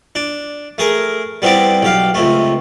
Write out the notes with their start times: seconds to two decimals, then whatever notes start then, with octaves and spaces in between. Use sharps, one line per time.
0.15 D4
0.78 A3 G#4 A#4
1.42 G3 B3 C4 E4 D5
1.82 B1 G4 F5
2.14 C#2 C3 A3